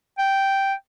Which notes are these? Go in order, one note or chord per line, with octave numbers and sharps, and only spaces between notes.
G5